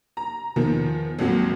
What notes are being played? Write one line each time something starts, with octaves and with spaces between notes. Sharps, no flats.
A#5
E2 D#3 F3 B3
G#1 F2 A#2 F#3